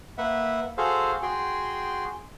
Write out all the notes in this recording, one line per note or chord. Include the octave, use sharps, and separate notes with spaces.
A#3 B4 E5 F#5
F#4 G#4 A4 C5 F5
F#4 G#4 G5 C6